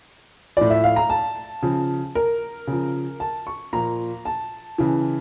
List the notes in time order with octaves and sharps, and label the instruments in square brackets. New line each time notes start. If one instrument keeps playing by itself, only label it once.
[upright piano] A2 F3 D5
E5
F5
A#5
A5
C#3 F3
A#4
C#3 F3
A5
C#6
A#2 F3 A#5
A5
C#3 E3